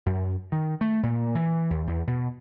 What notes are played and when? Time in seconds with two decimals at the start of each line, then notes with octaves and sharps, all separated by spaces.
0.06 F#2
0.52 D#3
0.81 A3
1.03 A#2
1.35 E3
1.70 D#2
1.87 E2
2.07 B2